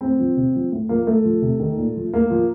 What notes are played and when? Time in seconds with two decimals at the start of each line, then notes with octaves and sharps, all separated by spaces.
0.01 A2 C4
0.19 F3
0.37 C3
0.55 F3
0.72 A2
0.89 F3 A#3
1.07 A2 A3
1.24 F3
1.42 C3
1.59 D#3
1.77 A#2
1.96 F3
2.13 A2 A#3
2.30 F3